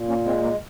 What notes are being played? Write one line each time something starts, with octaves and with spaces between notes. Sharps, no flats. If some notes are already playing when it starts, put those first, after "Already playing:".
Already playing: A#2
A#3 C#4
G#3 C4
A#3